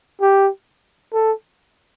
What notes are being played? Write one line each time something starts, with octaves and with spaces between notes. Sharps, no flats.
G4
A4